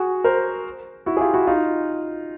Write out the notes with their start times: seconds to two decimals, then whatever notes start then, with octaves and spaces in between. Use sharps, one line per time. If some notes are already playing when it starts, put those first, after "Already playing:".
Already playing: F#4 G#4
0.24 A#4 C5
1.06 E4 F#4
1.17 G#4
1.21 F4 G4
1.34 E4 F#4
1.47 D#4 F4